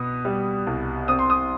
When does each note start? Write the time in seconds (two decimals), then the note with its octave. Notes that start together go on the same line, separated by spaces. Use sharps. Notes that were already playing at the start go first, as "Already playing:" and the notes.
Already playing: B2 B3 D#6
0.25 G3
0.66 C2
1.08 C4 D#6
1.19 C6
1.30 D#6